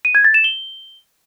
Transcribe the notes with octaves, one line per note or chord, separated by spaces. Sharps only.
D#7
G#6
A6
E7
G7